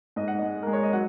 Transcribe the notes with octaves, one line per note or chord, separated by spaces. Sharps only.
G#2 D#5
F#5
G#3 D#5
G#3 A#4
C#5
D#5
F#3 F#5